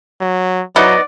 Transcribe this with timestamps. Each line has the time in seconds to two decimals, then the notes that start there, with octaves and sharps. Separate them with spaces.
0.21 F#3
0.76 F#3 B3 D#4 E4 D5